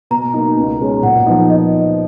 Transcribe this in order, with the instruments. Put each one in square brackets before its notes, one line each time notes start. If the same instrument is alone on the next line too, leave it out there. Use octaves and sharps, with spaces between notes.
[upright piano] B2 [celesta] A#5
[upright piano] A#3 D#4
C#2
B2 G#3 C#4
[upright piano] A#2 [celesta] F#5
[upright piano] F3 B3 D#4
[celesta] D#5